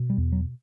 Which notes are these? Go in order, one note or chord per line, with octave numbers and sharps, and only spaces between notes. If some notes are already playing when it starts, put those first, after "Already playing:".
Already playing: B2
G3
E2
F#3